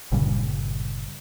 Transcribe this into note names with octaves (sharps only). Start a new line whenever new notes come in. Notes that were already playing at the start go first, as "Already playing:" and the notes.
G1 A#2 C#3 G3